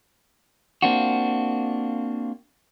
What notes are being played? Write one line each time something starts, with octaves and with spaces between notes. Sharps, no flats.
A#3 C4 D4 F4 F#4